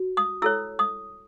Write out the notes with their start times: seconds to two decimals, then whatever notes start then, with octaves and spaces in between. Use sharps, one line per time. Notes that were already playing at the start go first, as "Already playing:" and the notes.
Already playing: F#4
0.17 D#6
0.42 E4 A4 C#5 E6
0.79 D#6